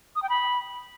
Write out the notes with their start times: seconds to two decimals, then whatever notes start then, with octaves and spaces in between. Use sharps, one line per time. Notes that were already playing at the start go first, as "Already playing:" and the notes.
0.16 D#6
0.23 G5
0.29 B5